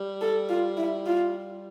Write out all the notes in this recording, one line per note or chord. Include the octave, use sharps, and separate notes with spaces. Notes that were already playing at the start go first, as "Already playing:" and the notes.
Already playing: G3
A4
F4
E4
F4